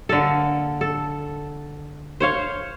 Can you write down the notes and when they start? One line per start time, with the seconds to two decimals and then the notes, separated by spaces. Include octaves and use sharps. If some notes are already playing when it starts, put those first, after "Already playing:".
0.09 D3 A#3 A4
0.81 A4
2.20 C5 C#5 F5